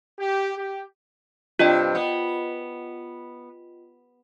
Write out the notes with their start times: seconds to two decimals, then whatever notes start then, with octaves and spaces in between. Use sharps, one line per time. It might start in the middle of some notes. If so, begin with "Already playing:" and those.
0.18 G4
0.57 G4
1.59 G2 C3 F4 D#5 G5
1.95 B3